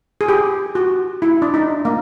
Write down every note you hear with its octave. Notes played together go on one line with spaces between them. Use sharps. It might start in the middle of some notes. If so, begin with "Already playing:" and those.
G#4
G4
F#4
E4
D4
D#4
A#3